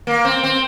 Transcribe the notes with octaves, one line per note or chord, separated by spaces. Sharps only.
A#3
C4
C4